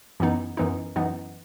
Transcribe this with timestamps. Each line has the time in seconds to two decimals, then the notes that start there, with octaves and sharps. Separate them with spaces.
0.20 F#2 E3 B3 D#4
0.57 F#2 E3 B3 D#4
0.96 F#2 E3 B3 D#4